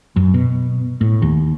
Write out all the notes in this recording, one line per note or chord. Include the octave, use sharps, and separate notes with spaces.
F#2
B2
A2
D#2